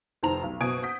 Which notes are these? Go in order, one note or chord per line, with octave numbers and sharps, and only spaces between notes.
F1 D#3 C5 A5 A#5 F7
B1
F#1 B2 G#5 D#6 G#6 D7
F#5 D#6 G6 B6